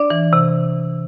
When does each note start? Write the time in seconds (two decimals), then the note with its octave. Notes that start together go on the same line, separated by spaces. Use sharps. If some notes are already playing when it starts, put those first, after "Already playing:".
Already playing: D4 D5
0.10 E3
0.33 C3